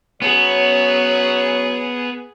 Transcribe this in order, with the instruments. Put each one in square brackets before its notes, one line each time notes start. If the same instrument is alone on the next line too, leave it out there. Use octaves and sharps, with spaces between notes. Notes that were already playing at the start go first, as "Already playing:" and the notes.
[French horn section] F#3 C#4 C#5 [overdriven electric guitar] B3 [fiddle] G#4